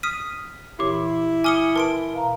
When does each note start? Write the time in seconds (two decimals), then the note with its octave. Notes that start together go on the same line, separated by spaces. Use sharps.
0.03 D#6 F6 B6 D#7
0.79 A#2 E3 E4 G4 C#5 D6
1.44 G#5 D6 D#6 F6 C#7 G7
1.76 A#4 B4 A5 C6 D7
2.13 B2 F5 A#5